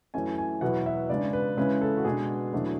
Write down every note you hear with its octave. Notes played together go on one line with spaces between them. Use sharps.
F#2 E3 A3 C#4 E4 G#5
G#5
E2 B2 F#3 B3 E4 F#5
E5
C#3 G#3 B3 D4 D5
B4
C#3 E3 G#3 C#4 E4 B4
A4
F#4
B2 G#3 D4 G#4
E2 B2 F#3 A3 D4